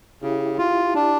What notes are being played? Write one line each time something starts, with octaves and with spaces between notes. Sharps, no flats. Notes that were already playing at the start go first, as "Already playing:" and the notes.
C#3 E4 G4
F4
D4